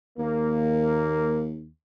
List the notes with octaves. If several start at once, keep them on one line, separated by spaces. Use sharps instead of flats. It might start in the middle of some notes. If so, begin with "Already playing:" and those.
D#2 A#3